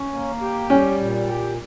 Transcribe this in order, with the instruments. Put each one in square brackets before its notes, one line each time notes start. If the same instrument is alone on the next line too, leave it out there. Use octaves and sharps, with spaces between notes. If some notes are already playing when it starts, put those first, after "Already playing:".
Already playing: [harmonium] C#4
A#3
G4
[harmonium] G3 [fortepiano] C#4
[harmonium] A#2
G4